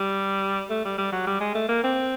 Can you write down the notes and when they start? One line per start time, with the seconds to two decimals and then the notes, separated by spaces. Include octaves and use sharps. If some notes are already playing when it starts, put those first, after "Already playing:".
Already playing: G3
0.70 A3
0.85 G3
0.98 G3
1.12 F#3
1.27 G3
1.40 G#3
1.55 A3
1.68 A#3
1.83 C4